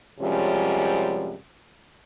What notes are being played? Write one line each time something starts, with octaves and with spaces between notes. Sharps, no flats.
F#2 C3 F3 G3 G#3 C#4